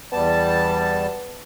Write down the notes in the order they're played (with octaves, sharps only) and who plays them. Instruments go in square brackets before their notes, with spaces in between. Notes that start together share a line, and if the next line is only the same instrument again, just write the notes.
[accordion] E2 G3 A5 [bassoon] B3